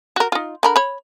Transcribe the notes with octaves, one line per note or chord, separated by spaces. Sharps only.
F#4 A#4
D#4 F4
D3 A#4 B5
C#5 B5